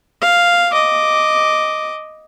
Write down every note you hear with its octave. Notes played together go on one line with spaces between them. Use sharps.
F5
D#5 D6